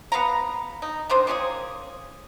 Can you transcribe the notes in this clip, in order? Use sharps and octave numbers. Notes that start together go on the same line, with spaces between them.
B3 F5 F#5 A#5
D#4
D#3 D4 C5
A#3 C#4 G4 G#4